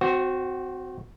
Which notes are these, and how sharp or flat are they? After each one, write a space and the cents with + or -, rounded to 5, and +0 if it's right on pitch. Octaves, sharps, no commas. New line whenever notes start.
C4 -25 F#4 +0 C5 +25